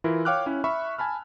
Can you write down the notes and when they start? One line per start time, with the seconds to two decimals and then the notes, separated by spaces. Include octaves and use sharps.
0.04 E3 E4 F4 A#4
0.25 C#5 F5 G5 D6 F6 F#6
0.46 C#4 E4
0.64 E5 B5 C#6 E6
0.98 G#5 A5 B5 F6